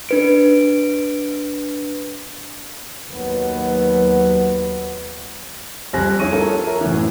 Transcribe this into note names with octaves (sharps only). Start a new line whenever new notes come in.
D4 B4 D7
D#2 F#3 B3
F2 G3 C5 G#5 F#6 A#6
D4 E4 G#4 C#5 C#6 D#7
F4 A4 A#4 C#5 A5
A#4 E5
F#2 A2 E3